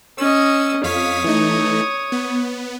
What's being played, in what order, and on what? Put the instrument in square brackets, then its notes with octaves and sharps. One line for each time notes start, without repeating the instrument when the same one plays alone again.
[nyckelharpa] C#4 D#5 [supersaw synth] E6
[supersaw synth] F2 F5 B6 [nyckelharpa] C#5 D#6
[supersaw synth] E3 A3 D#4
B3